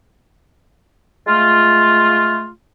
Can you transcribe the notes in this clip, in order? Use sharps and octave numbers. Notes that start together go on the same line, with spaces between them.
G#3 A3 F4